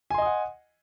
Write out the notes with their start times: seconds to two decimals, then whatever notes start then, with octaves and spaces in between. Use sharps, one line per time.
0.10 G#5
0.14 C6
0.18 D#5
0.22 D#6
0.26 F#5